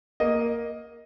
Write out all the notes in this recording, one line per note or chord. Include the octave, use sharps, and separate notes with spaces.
A#3 D#5